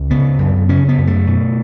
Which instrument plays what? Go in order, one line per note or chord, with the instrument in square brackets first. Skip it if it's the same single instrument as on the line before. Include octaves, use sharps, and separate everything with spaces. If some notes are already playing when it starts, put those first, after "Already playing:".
Already playing: [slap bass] C#2
C#3 B3
F#2
C#3 C#4
B3
F#2
A3
B2